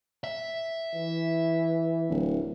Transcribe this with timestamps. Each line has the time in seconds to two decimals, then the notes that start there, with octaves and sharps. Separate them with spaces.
0.24 E5
0.95 E3
2.09 D1